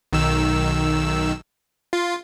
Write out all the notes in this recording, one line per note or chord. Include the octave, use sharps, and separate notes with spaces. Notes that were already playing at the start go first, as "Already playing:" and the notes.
B1 D#3 E6
F4